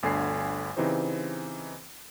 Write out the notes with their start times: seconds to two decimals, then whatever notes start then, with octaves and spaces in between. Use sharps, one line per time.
0.03 G1 D2 D3 G#5 C7
0.77 C#3 E3 C4 D#4 G4 C5